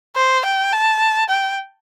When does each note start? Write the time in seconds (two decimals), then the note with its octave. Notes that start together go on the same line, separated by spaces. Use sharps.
0.16 C5
0.45 G5
0.73 A5
1.29 G5